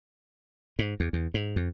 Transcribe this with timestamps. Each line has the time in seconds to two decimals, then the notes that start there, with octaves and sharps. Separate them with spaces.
0.79 G#2
1.00 E2
1.13 E2
1.34 G#2
1.56 F2